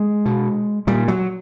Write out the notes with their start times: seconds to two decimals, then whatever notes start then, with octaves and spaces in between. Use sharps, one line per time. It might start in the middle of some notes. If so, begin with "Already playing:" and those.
Already playing: G#3
0.26 B2
0.87 A#2 G3
1.08 F#3